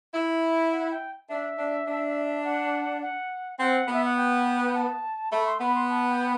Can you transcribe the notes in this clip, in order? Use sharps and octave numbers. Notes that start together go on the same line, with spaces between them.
E4 E5
F#5
G5
D4 E5
D4
D4
F#5
F#5
C4 F#5
B3
E5
F#5
G5
G5
A5
A3 B5
C6
B3 B5
C6
A5
G5